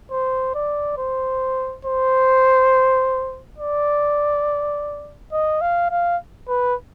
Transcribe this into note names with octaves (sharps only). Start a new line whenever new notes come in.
C5
D5
C5
C5
D5
D#5
F5
F5
B4